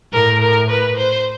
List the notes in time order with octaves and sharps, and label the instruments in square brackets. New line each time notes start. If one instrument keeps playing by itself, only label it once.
[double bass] A2 [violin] A#4
[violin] A#4
B4
C5